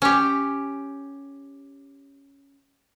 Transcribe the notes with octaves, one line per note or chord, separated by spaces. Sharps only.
C#4 G4